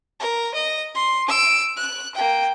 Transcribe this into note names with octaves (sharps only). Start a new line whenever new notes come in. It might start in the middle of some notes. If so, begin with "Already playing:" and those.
A#4
D#5
C6
E6 D7
F#6
A#3 G5